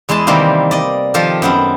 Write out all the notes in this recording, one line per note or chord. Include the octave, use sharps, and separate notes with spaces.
E2 G#3 E4 G#4 A5
C3 D#3 E3 G3 A#3 C4
D5 D#5
D#3 F3 F4 G4 A4
F#2 B3 C4